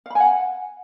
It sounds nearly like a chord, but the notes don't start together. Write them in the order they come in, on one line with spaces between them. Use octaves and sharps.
F5 B5 G#5 F#5